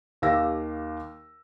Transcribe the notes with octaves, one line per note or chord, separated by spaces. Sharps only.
D#2 G4 F5 E6 A#6